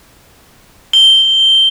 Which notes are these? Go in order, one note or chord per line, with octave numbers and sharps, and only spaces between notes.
G7